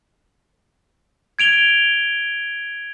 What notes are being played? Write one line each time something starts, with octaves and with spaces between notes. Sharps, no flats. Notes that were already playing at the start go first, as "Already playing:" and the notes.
G#6 D7 F7 G7